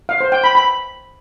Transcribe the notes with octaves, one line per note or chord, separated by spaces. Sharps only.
F5
C5
G5
B5
B5